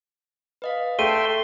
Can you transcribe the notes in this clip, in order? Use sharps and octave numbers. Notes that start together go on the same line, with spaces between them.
B4 D#5 F5
A3 E5 G5 C6 C#6 D#7